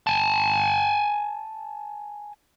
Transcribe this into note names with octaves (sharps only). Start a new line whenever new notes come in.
G#5 A5